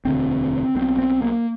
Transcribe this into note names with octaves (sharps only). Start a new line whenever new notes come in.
E1 D2 D3 C4
B1 B2 C4
C4
A#3